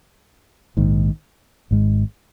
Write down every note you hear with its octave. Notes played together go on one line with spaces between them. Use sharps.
A#1 G#2 D#3
G#1 G#2 G#3